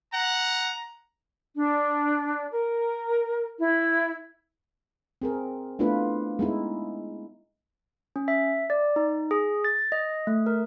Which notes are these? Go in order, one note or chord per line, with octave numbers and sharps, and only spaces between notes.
F#5 A#5
D4
A#4
E4
C4 G#4 A#4
A3 B3 D4 E4 F4 B4
G#3 B3 D#4 E4
C#4
E5
D5
D#4
G#4
A6
D#5
A3
A#4